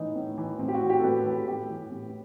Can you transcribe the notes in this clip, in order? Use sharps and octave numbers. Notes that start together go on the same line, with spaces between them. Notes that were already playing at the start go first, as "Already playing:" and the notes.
Already playing: A2 E3 D#4
A2
E3
A2 C4
G4
F#4
E3
G4
A4
A2 B4
E3 A4
A2 G4
E3
A2